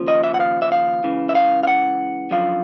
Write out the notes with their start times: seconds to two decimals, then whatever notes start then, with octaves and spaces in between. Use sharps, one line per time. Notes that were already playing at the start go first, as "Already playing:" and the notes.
Already playing: D#2 C#3 F3
0.08 D#5
0.24 E5
0.34 F#5
0.40 F5
0.62 E5
0.72 F5
1.03 C#2 C#3 E3
1.29 E5
1.35 F5
1.63 F5
1.67 F#5
2.31 F#2 D3 F3 F5